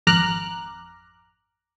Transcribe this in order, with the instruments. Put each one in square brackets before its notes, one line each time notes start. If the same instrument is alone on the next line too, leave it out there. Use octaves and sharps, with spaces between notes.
[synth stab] G#1 F2 A#5 D6 F6 F#6